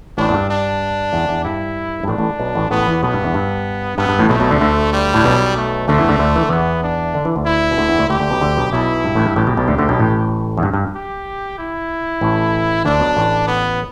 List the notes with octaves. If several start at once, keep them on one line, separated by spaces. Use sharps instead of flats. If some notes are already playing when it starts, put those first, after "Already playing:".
A1 A2 D4
E2
G2
D4
E2
E2
G2 E4
G2
A1 A2 D4
A1 A2
B1 B2
A1 A2
A1 A2 B3
E2 E3
B1 B2 B3
G2
E2
G2
G2 B3
G2
A1 A2
B1 B2 A3
B1 B2
D2 D3
D2 D3
G3
A2
B1 B2
A3
D2 D3 A3
E2 E3
D2 D3
D2 D3
E3
D3
E2 E3 B3
D4
D3
E3
D2 D3
E4
B2
D2 D3
E2 E3
D2 D3
D2 D3 G4
D2 D3
B1 B2
D2 D3
B1 B2
B1 B2 E4
G2
A1 A2
G2
A1 A2 G4
B1 B2
B1 B2
D2 D3
D2 D3
B1 B2
A1 A2
E2
G2
G2
G4
E4
A1 A2
D2 D3 D4
B1 B2
A1 A2
B3